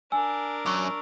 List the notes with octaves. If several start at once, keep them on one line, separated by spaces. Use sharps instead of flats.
D4 A#4 G#5 E6
F#2 C#6 D6 E6 F7